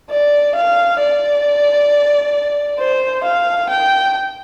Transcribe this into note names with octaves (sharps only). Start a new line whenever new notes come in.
D5
F5
D5
C5
F5
G5